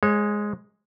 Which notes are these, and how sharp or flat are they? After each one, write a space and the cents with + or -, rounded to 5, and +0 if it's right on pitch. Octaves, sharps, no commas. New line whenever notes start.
G#3 +0 G#4 +0 C#5 -35